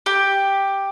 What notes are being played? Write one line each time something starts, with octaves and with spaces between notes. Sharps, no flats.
G4